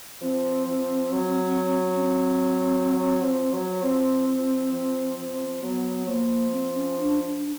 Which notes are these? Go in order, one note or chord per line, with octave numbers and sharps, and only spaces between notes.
F3 C4
F3
F#3
C#4
C4
F#3
F3
F#3
F3 C4
F3
F3
F3
F#3 B3
F3 A#3
C4
C#4
D4
D4
D4